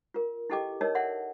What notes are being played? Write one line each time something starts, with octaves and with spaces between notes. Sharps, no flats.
F4 A#4
E4 G4 A4 D#5 G5 D6
D#4 A#4 C#5 D#5 A5 E6
A4 D5 E5 F#5 C6